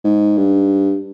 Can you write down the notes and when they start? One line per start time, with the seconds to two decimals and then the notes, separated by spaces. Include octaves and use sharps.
0.04 G#2
0.37 G2